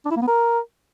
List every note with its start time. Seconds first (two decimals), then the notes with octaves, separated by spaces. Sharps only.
0.05 D4
0.11 E4
0.16 A#3
0.22 B3
0.27 A#4